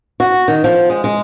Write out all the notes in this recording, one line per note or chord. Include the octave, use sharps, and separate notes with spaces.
F#4
D#3
F3
G#3
G#3